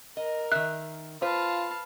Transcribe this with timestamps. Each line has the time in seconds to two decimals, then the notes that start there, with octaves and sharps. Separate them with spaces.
0.17 A#4 D#5
0.52 D#3 E5 F#6
1.22 F4 B4 C5 F5 A5